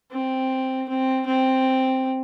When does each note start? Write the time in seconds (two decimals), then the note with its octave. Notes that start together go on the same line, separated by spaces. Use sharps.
0.11 C4
0.88 C4
1.26 C4